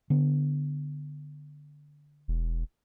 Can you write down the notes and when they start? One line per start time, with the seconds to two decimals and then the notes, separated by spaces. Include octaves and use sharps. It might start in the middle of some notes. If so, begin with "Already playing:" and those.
0.10 D3 B3
2.28 E1